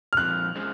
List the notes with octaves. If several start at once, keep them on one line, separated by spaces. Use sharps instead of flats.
F6
A#2 F3 C4 F#6
G#3 C#4 G#4 C5